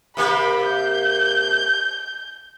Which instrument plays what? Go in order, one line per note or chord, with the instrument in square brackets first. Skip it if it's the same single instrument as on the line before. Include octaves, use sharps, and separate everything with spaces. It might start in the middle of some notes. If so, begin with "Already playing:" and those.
[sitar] C3 A#3 G4 [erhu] B5
[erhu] G6